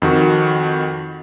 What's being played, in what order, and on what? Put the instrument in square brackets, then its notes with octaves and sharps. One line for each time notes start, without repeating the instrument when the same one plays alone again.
[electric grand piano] F2 D#3 F#4